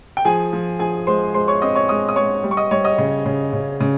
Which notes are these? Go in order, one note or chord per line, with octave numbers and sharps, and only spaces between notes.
G5
F3 G#4 G#5
F3
F3 G#4 G#5
G#3 C5 C6
G#3 C5 C6
C#5 C#6
C4 D#5 D#6
C#5 C#6
G#3 D#5 D#6
D#6
G#3 C#5 C#6
G3
C#6
D#5 D#6
G3 C#5 C#6
D#5 D#6
C#3
C#3
C#3
C#3